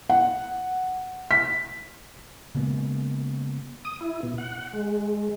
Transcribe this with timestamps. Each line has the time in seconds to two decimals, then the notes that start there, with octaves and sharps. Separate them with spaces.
0.10 F#5
1.31 B6
2.55 C#3 G#3 A#3 B3
3.85 D#6
4.01 E4
4.23 B2
4.38 F#5
4.73 G#3